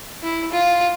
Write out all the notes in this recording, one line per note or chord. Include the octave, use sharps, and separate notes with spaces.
E4
F4